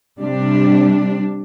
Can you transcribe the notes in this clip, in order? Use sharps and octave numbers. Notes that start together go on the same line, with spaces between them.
C3 G3 D4